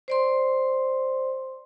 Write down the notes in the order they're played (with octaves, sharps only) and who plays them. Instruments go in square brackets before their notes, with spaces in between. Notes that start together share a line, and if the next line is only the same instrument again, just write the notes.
[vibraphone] C5 D5 C6